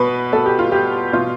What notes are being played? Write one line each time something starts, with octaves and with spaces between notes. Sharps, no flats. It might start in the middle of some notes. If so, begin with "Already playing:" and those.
Already playing: B2 B4
B2 A4
G4
F4
G4
B2 F4